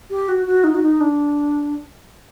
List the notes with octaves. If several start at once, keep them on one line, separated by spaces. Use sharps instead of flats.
G4
F#4
F#4
D#4
F#4
D#4
D4